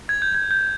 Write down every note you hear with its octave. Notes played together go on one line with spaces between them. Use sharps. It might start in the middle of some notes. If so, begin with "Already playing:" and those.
G#6
G6
G#6
G6